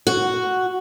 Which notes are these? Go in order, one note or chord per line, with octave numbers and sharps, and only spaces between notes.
F#4